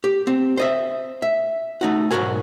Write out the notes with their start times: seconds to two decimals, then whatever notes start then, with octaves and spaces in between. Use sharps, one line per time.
0.04 G4
0.27 C4
0.57 C5 D#5 E5
1.22 E5
1.81 A3 D#4 F#4
2.11 B1 G#2 C3 F#4 A#4 G#5